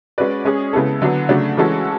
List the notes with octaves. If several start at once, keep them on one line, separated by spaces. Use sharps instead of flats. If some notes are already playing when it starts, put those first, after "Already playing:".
G#3 C#4 F#4 B4 D5
G#3 C#4 G#4
C#3 G#3 B3 E4 A4
D3 F#3 B3
C#3 F#3 A3 D4 F#4
E3 G#3 C#4 F#4 A4